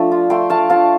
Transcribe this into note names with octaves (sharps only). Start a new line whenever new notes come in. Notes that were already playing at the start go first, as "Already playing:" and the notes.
Already playing: F3 A3 D4
F4
A3 G5 C6
A3 F5 A5
F4 F5 A5